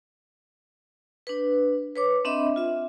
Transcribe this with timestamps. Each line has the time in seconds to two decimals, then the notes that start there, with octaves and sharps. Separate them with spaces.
1.27 D4 B4
1.96 B4 C#5 D6
2.25 C4 D4 D#5 E5 B5
2.56 F4 E5